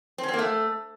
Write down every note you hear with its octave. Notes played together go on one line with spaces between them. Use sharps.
C4
C#4
C4
A#3
A3